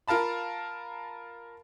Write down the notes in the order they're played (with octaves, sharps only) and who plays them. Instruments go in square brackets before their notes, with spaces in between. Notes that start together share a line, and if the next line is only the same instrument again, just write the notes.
[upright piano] F4 A#4 F5 A5 B5